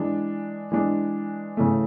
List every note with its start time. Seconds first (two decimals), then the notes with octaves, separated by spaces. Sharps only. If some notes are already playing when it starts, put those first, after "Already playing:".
Already playing: E3 G#3 D4
0.72 E3 G#3 D4
1.57 C#3 E3 A3